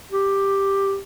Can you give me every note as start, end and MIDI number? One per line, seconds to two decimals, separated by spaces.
0.12 0.98 67